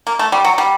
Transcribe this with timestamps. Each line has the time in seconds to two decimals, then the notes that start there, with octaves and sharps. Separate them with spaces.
0.07 A#3
0.19 A3
0.32 G3
0.44 F#3
0.58 G3